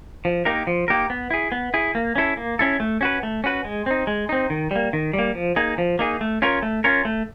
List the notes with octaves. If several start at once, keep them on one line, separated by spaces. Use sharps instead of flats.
F3
A#3 D#4 G4 A#4
F3
A#3 D#4 G4 A#4
B3
E4 G#4
B3
E4 G#4
A#3
C#4 E4 A4
A#3
C#4 E4 A4
A3
C#4 F#4 B4
A3
C#4 F#4 B4
G#3
C4 D#4
G#3
C4 D#4
D#3
G3 A#3
D#3
G3
A#3
F3
A#3 D#4 G#4
F3
A#3 D#4 G#4
A3
C#4 F4 A#4 C#5
A3
C#4 F4 A#4 C#5
A3